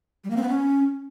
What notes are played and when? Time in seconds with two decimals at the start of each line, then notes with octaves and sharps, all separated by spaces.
0.24 G3
0.31 A#3
0.37 C4
0.43 B3
0.49 C#4